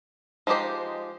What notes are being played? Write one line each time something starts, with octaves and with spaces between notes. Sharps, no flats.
F3 G#3 D#4 G4 C5